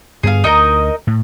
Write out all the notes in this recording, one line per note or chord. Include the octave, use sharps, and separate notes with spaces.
G2 B3 G#4 F5
D2 D#4 A#4 D#5
A2